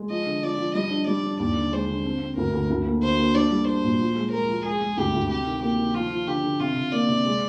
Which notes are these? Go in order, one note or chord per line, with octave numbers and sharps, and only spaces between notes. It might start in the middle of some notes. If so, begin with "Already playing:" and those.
Already playing: G#3
F3 D#5
D3
F3 D5
F3
G3 D#5
D4
G3 D5
D4
D#2 D5
D3
G#3 C5
D3
C4
C4
D2 A#4
D2
D2
A#3
D3 C5
A#3
D4 D5
G3
D4 C5
A#2
F3
G#3
G#3 A#4
F3
G#3 G#4
G#3
D2 G4
D2
C3 G4
D#3
A#3 G4
D#3
F3 F4
F3
D3 G4
D3
C3 F4
C3
A#3 D5
C3
G#3